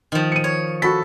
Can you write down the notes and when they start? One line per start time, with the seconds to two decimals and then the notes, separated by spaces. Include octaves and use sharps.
0.12 D#3 F3
0.32 C#7 D#7
0.44 C#5
0.82 F#4 A4 B5 B6